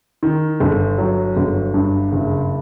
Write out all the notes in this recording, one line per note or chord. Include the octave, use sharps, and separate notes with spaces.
D#3
G1
F#3
G1
G2
F#1